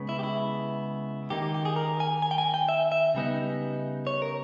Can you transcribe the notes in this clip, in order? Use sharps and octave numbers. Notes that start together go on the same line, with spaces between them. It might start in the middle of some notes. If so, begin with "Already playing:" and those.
Already playing: C#3 G#3 B3
E4
G4
E4
D#3 A#3 D#4 G4
G4
G4
G#4
A#4
G#5
G#5
G5
G#5
G5
E5
E5
C#3 G3 B3 D#4
C#5
A#4